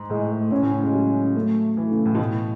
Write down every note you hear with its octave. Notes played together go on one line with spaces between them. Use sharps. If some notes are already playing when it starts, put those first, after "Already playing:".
Already playing: G#2
A2 G#3
A3
A2 C#4
A2
C#3
G#3
F#3
A3
E3
C#3
A2
B2
A2